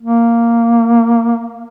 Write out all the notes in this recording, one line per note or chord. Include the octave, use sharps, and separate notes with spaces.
A#3